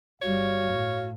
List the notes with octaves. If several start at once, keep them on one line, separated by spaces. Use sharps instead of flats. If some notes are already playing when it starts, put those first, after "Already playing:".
G1 G3 F#4 C#5 F5
A2